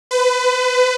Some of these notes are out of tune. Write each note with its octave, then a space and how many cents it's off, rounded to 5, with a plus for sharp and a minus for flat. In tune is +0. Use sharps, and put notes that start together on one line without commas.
B4 +35